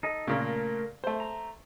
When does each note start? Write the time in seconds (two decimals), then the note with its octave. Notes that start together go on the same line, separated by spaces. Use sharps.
0.03 D#4 A4 D#5
0.27 A#2 C#3 A3 A#4
1.04 A3 C5
1.20 A#5